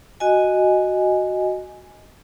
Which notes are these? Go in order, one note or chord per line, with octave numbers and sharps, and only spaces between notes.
F#4 D#5 G#5